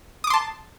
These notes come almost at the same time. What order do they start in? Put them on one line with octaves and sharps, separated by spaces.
D#6 D6 C6 A5